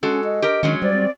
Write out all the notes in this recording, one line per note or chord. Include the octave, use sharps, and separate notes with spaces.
G#3 C#4 F#4 A4
D#5
G4 A#4
D#3 F#3 G#3 C#4
G3 C5 D5
C4